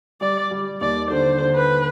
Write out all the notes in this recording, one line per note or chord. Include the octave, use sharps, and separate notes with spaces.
G3 D5
G3
D#2 D5
D3 C5
D3
B4